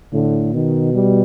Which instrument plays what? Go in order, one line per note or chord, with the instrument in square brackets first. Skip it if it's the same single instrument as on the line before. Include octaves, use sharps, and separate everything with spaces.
[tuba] A2 [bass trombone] D3
[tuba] B2 [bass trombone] D#3
[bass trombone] G3